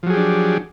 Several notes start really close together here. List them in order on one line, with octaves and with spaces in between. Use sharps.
F3 F#3 G#4 G4 D4